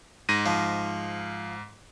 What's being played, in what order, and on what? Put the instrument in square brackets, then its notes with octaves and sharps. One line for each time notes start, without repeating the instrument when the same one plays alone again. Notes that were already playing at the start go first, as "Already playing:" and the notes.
[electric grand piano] G#2 A#6 D#7
[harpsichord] F3